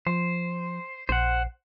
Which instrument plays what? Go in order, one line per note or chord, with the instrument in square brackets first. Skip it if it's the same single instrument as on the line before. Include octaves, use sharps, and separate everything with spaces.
[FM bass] F3 [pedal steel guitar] C5
[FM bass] A#1 [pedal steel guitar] C5 F#5